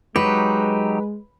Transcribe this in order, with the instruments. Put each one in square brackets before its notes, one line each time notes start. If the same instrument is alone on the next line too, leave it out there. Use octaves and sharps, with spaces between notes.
[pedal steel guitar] F#3 D#4 G4 [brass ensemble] G#3 [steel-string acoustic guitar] B4